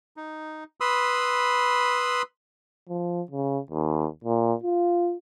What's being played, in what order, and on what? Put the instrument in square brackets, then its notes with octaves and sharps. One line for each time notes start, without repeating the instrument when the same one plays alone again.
[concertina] D#4
B4 B5 C6 D#6 E6
[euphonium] F3
C#3
D#2
A#2
F4